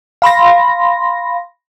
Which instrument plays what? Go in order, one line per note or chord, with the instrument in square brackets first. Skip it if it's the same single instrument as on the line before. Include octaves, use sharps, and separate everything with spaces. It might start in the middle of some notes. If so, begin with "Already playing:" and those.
[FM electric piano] F5 B5 C6 A#6